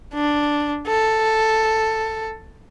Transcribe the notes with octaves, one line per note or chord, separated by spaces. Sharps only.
D4
A4